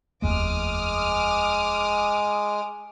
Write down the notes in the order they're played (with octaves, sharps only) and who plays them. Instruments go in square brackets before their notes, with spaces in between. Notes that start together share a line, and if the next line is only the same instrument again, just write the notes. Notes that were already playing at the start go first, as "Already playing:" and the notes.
[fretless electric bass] F1 D#2 A3 [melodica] G#3 [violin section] D6 D#6 F6